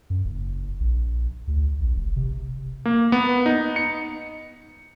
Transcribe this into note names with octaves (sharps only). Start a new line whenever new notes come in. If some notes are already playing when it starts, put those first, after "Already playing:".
F#2
F#1
A#1
D2
A#1
F1
C3
A#3
B3
D#4
C#7